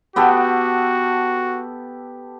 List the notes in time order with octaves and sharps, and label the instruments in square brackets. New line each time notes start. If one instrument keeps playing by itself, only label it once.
[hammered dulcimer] B3 G4 A4 [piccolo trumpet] F#4